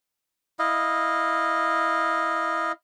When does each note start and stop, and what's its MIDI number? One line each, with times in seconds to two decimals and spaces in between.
0.59 2.72 64
0.59 2.72 75
0.59 2.72 77